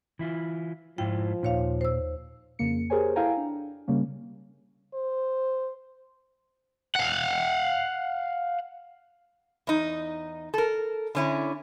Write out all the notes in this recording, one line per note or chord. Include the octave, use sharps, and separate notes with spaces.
E3 E4 F4
G#2 F3 E4 F4 G5
D#2 A#2 C#5 F5
C5 E6
F2 C#3 A#3 C#7
G4 G#4 A#4 C5 C#5 G#5
E4 A4 F5 G5 G#5 A#5
D4
C#3 G3 A#3 C#4
C5
F5 F#5
E2 D#4
A4 A#4
D3 C#4 E4